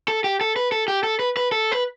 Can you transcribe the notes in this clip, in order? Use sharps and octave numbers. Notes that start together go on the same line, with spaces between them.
A4
G4
A4
B4
A4
G4
A4
B4
B4
A4
B4